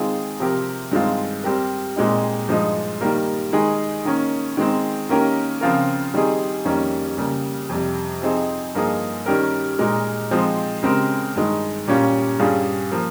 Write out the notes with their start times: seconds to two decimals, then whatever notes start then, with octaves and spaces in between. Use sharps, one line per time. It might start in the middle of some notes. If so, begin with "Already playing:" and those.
Already playing: D#3 G#3 C4 F4 G#4
0.39 C3 F3 C4 G4 A#4
0.92 G2 D#3 G#3 C4 F4
1.44 G3 C4 G4 A#4
1.96 A#2 G#3 C4 D#4
2.49 G2 F3 G#3 D#4
3.01 D#3 G3 A#3
3.53 D#3 G#3 D#4 G#4
4.05 D#3 A#3 C#4
4.57 D#3 G#3 C4
5.09 D#3 A#3 C#4 G4 A#4
5.61 C#3 F3 C4 F4 A#4
6.14 D#3 G3 C4 D#4 G#4
6.65 F2 D#3 G3 A#3 C#4
7.18 C#3 G3 A#3
7.69 F2 C3 G3
8.22 F3 C4 D#4 G#4
8.75 G2 F3 A#3 D#4 G#4
9.26 D#3 G3 C#4 G4 A#4
9.79 A#2 G#3 D#4 A#4
10.31 F3 G#3 C4 D#4
10.83 C#3 G#3 C4 G4 A#4
11.35 G2 D#3 G#3
11.88 A#2 G3 C#4 F4
12.39 G2 G3 C#4 F4 G#4
12.91 F3 A#3